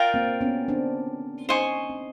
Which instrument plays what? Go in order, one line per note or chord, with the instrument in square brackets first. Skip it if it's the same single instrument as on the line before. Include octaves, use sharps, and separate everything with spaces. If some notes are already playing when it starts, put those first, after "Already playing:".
Already playing: [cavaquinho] F4 A#4 D5 G5
[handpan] A#3 C4
B3 C#4
C4 D4
[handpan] C#4 D#4 [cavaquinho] C5 D#5 G#5 C#6
[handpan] C4 D4